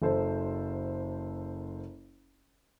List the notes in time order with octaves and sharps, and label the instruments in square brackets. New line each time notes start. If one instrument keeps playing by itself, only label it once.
[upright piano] F#1 A4 C5